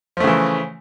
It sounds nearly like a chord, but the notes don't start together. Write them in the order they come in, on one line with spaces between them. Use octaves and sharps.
F3 A3 C#3 E3